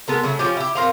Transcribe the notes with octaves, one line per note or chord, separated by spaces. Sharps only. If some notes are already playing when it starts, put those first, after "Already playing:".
G#3 B3 A4 A#4
C#3 F#3 A3
F3 C#4 G4
E4 G4
C4 A#4 C5 F5